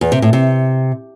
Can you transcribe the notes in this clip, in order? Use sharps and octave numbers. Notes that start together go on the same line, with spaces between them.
E2
C3
A2
C3